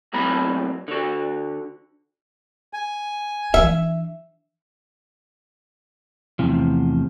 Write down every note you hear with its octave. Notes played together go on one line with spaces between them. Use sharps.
B1 A2 F#3 C4 A#5 B5
D3 F#4
G#5
E3 D4 E5
E2 A2 C3 F3